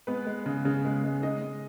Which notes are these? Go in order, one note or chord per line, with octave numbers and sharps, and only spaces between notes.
G#3 B3 B4
G#3
C#3
C#3
G#3
G#3
G#3 D#4 D#5
G#3